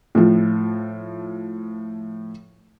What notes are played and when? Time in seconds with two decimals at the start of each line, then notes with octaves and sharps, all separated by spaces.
0.15 A2 F3